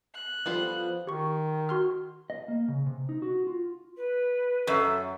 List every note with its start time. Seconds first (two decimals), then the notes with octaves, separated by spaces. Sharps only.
0.15 F#6
0.46 F3 G3 B3 A4 C5
1.07 D#3 G4 C#6
1.69 F#4 C6 F6
2.30 D#5
2.48 A#3
2.68 C#3
2.86 C3
3.09 D#4
3.22 F#4
3.47 F4
3.97 B4
4.67 F#2 A4 E5